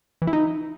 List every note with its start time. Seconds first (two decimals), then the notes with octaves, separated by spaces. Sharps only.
0.22 E3
0.27 E4
0.33 D#4